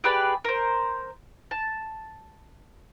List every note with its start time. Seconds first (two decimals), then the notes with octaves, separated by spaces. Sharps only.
0.04 G4 G#4 B4 D5
0.45 A#4 C5
1.51 A5